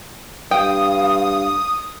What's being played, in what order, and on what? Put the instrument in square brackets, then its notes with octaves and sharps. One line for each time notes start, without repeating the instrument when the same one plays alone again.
[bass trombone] G2 [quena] F5 [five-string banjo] G5 [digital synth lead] D#6